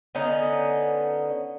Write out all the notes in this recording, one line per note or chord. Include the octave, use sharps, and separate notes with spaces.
D3 B3 C#4 D#4